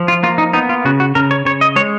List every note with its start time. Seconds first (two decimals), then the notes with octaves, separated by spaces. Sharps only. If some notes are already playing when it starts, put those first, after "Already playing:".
Already playing: F3
0.08 F4
0.23 A#3 F4
0.38 D#4
0.53 B3 D#4
0.69 F4
0.85 C#3 F#4
1.00 F#4
1.15 C#3 A#4
1.31 C#5
1.45 C#3 C#5
1.61 D#5
1.76 G#3 C#5